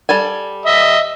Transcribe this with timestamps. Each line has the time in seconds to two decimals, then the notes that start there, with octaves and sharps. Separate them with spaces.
0.09 G3 A4 G#5
0.65 D#5 E5